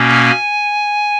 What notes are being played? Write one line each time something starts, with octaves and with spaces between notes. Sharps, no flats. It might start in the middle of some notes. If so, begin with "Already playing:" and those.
Already playing: B2 A#3 C#4
G#5